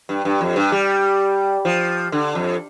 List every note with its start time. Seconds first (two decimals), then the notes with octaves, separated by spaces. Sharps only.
0.09 G2
0.25 G2
0.41 F2
0.56 G2
0.72 G3
1.65 F3
2.12 D3
2.35 F2